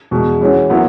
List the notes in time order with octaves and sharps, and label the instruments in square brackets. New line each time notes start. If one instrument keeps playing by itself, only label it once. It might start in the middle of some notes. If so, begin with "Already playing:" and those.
[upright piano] E2 B2 G#3
E3 G#3 C#4 F#4
A#2 F#3 B3 E4